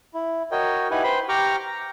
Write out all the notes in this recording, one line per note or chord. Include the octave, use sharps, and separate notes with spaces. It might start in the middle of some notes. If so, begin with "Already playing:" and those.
E4
F#4 A#4 C#5 D#5 G5
D#4 E4 G4 B4 F#5 G#5
B4 C5 G5 B5 C6
G4 G5 A#5 C#6 D6 F6
A#5